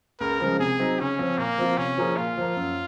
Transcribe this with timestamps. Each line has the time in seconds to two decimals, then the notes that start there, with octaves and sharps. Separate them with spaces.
0.20 C#2 A#4
0.40 C#3 F3 G#3
0.59 C3 G#4
0.79 F#3 C4 D#4
1.00 C#3 C#4
1.19 F3 C4
1.38 A#2 A#3
1.58 F3 C4 F4
1.77 C3 C#4
1.97 F3 A#3 F4 G#4
2.17 A#2 F4
2.37 F3 A#3
2.56 F#2